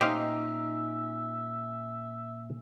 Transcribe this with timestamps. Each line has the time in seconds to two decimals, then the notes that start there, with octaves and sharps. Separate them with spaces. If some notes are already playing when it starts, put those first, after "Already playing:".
0.01 A#2 C#4 D#4 G4 C5 E5 F5